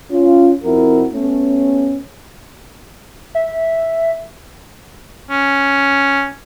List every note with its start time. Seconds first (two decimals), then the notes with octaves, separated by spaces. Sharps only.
0.11 C#4 F4
0.64 F2 C4 E4 F#4 A#4
1.13 A3 B3 C#4
3.35 E5
5.31 C#4